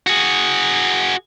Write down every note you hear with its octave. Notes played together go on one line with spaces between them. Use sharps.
F#4 G#4